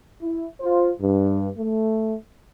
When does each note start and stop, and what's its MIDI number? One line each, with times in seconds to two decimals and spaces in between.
0.21 0.45 64
0.61 0.89 65
0.61 0.89 72
0.99 1.48 43
1.58 2.14 57